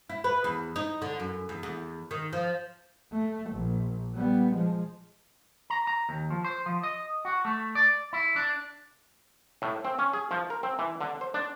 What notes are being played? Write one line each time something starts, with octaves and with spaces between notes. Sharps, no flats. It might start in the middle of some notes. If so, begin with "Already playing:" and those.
E4
B4
E2
D#4
D3
F#2
E2
E2
D#3
F3
A3
A#1
G3 B3
F3 G#3
A#5
A#5
D#2
F3
C5
F3
D#5
F#4
A3
D5
E4
D4
A2
C4
C#4
G#4
F3
A#4
C4
E3
D3
C5
D4